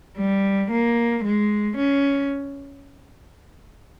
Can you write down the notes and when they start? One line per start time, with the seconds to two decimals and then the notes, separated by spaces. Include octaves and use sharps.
0.18 G3
0.71 A#3
1.24 G#3
1.77 C#4